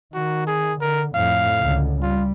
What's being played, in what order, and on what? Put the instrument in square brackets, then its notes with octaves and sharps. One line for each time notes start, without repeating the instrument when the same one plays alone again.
[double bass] D#3 [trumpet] F#4
[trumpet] G#4
[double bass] D3 [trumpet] A#4
[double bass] F2 A2 [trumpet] F5
[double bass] C#2 D3
[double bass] G3 [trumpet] F4